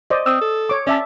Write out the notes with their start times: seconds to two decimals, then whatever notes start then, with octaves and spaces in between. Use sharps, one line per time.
0.10 C5 D5 D#5
0.26 C4 D#6 E6
0.41 A4
0.69 C#5 D6
0.87 C#4 D5 E5 A5